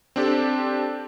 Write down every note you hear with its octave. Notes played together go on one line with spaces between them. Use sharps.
C4 D4 G4 A4